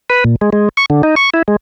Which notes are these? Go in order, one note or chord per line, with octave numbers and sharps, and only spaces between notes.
B4
A#2
G#3
G#3
C#6
D3
D#4
C#6
E4
G#3